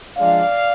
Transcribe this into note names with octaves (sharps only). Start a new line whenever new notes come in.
F3 G#3 D4 D5 F5